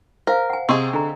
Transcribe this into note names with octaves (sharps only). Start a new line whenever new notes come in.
A#4 C5 F5
F#5 G#5
C3 C4 G#4 D#5 C#6
D3 G#5 A#5